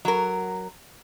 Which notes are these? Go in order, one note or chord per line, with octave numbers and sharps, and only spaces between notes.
F#3 A#4